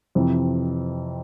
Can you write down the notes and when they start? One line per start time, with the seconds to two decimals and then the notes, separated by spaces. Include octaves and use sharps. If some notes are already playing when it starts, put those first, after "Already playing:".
0.15 F2 C3 E3